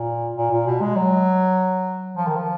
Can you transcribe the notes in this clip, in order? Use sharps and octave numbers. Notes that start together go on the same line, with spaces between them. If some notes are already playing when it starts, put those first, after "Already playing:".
Already playing: A#2
A#2
A#2
B2
G#3
F#3
F3
D#3
F3